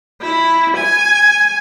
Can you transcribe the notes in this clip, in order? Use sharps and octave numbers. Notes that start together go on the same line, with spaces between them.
E4
G#5